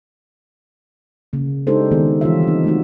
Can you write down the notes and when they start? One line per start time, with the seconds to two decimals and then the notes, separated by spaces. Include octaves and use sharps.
1.33 C#3 A#3
1.67 G#3 D4 D#4 G4 A4 C5
1.91 D#3 G#3 A#3 B3 G#4
2.21 E3 G3 F4 G4 C#5 E5
2.43 C4 D#4
2.64 A3 D4 D#4 F#4